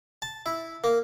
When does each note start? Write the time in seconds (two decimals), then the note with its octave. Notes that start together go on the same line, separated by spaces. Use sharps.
0.22 A5
0.46 E4
0.84 A#3